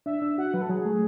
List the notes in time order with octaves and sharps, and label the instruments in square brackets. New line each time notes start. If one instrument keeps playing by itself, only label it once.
[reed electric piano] D4 [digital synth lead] E5
[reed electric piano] D4
[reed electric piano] F#4 [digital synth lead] F#5
[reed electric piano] F#3 [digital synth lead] B4
[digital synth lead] A4
[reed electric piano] F#3 [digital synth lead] G#4
[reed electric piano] A3